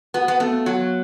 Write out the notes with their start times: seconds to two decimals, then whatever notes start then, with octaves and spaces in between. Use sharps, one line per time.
0.14 B3 F#4
0.28 B3
0.40 A3 B3
0.66 F#3 F#4